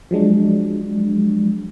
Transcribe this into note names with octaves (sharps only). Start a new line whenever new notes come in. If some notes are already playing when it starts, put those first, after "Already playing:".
F3 F#3 G#3 D4